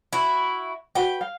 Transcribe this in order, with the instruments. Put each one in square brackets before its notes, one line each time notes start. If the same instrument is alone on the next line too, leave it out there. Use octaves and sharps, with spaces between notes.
[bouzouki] E4 F#4
[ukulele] F#4 B4 [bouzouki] G5
[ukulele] F5